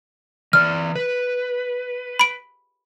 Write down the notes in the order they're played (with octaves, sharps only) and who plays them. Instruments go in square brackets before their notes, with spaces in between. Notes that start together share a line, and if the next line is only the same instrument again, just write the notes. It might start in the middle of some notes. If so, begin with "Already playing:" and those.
[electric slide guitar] E3 D5 [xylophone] F6
[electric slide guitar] B4
[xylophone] B5 D7